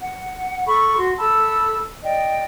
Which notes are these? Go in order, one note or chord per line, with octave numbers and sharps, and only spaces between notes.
F#5
A4 B5 C#6
F#4 C6
A4 A5 B5 E6
D5 D#5 G5